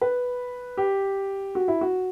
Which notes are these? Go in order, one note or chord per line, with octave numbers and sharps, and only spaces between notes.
B4
G4
F#4
E4
F#4